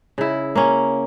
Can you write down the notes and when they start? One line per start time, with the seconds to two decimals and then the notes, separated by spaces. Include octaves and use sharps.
0.18 C#3 E4
0.55 A#3 C#4